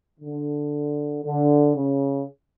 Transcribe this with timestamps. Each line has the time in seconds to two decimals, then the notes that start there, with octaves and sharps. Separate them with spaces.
0.20 D3
1.23 D3
1.76 C#3